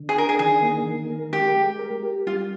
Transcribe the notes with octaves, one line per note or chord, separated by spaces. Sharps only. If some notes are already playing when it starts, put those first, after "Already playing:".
Already playing: D3
G#4
D4 A#4
G#4
D#3 G#4
A#3
D#3
A#4
G#3 G4
G#3
A#4
G4
G3 F4